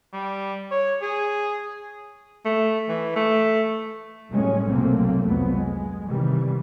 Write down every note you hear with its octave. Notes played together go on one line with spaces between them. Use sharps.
G3
C#5
G#4
A3
E3
A3
F#1 A2 G3 G#3 C#4
F1 B1 F#3 A3 A#3 C4
C2 F2 G#2 F#3 A3 B3
G#3
G#2 C3 D#3 E3 G3